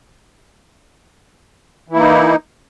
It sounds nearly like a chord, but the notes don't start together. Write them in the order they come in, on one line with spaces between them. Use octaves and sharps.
E3 E4 A#3 D#4